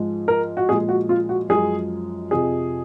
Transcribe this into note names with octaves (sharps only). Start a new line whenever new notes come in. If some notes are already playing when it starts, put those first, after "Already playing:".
Already playing: G#2 F3 G#3
A#4
F#4
A#2 F3 G#3 G#4
F#4
F4
F#4
F#2 F3 G#3 G#4
F2 C3 F3 G#4